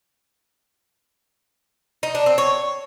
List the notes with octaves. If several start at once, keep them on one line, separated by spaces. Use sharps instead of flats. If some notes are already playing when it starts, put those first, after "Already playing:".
D#4
D4
C4
C#5